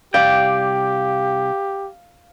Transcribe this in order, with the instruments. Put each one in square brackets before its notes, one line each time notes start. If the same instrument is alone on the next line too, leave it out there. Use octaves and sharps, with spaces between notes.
[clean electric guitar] C2 D5 G5 [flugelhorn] G4 [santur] F5